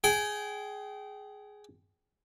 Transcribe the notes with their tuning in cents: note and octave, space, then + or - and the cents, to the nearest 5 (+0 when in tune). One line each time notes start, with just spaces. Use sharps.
G#4 +10 G5 -20